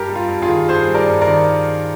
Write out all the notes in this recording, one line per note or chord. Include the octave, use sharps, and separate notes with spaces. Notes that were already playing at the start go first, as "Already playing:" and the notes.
Already playing: G2 G4 A#4
G3
F4
G2
F4 G#4
D#3
G2 G#4 C5
G3
A#4 D5
G2
A#4 D5
D#3